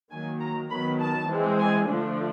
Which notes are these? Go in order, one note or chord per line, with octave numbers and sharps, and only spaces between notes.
D#3 F#3 A#3 G#5
A#5
D#3 F#3 B3 B5
A5
E3 G#3 C4
G#5
D3 F3 A3 D4